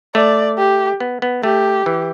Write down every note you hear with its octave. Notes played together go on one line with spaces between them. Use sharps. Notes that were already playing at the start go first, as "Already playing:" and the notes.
A3 D5
G4
B3
B3
A3 G4
E3